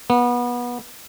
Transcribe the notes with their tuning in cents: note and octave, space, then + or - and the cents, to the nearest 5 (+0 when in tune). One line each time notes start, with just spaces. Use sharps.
B3 -25